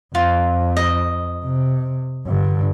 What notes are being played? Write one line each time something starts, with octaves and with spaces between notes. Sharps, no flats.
F2 F4
D#5
C3
G2 D3